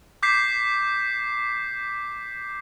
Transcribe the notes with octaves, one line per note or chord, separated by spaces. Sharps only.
D6 G6 B6 C7